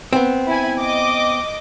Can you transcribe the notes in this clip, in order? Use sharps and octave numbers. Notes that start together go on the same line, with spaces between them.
B3 C4
E4 G#5
D#5 D6